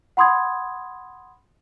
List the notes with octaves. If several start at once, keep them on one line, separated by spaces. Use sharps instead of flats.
F#5 B5 C6 D#6 G#6